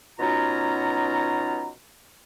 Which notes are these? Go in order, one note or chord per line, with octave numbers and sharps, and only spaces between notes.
B2 F#3 C#4 D#4 F4 A#5